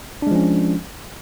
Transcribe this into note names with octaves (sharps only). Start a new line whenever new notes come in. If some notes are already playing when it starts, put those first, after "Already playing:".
F3 G#3 C#4 D4